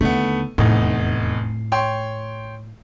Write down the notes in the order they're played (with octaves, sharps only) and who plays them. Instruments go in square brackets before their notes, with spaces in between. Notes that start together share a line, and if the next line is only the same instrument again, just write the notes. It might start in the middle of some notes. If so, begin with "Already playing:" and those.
[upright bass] D#2 D3 [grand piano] A3 B3
[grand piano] F1 E2 D#4 [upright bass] A2
[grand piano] C#5 G5 C6